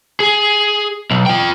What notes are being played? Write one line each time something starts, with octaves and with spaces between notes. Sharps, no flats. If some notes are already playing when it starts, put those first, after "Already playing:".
G#4
B1
F4 G5